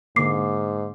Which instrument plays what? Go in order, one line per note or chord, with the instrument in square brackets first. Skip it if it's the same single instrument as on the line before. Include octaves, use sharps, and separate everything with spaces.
[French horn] G#2 [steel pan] D3 A#3 [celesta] D6 C7